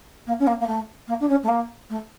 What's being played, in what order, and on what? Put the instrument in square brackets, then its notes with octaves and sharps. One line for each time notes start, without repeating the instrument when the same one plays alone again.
[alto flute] A#3
C#4
A#3
A#3
A3
A#3
D4
C#4
A3
A#3
A3